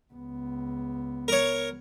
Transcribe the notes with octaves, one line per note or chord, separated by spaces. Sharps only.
C#2 B3
A#4 C#5